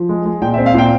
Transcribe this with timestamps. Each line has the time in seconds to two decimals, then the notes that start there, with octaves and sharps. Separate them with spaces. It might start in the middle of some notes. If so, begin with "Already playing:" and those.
Already playing: F3
0.09 G#3
0.25 G#3
0.41 A#2 G5
0.54 E5
0.58 C4
0.66 F5
0.74 A#2 G5